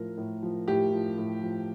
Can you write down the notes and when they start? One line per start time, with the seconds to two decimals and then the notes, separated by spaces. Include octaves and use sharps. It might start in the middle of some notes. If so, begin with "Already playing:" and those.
Already playing: A2 F3 A#4
0.18 A2
0.43 F3
0.68 A2 G4
0.92 F3
1.18 A2
1.43 F3